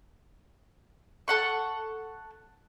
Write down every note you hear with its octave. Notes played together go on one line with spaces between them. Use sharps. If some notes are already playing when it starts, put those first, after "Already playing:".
A4 F#5 C#6